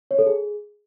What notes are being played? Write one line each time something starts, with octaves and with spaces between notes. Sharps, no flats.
C#5
A4
G#4